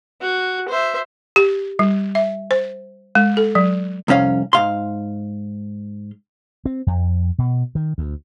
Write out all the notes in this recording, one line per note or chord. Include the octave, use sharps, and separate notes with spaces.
F#4
C5 E5
G4
G3
E5
C5
G#3
A4
F#3
C2 F2 C#4 F5
G#2 F5 C6
C4
F2
B2
D#3
D2